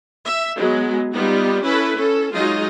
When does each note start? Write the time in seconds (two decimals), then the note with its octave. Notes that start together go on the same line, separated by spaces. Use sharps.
0.24 E5
0.56 F#3 G#3 B3
1.14 G3 B3 D#4 F4
1.63 C#4 E4 A4 B4
1.96 C#4 A4
2.33 F#3 G#3 D#4 F4 D#5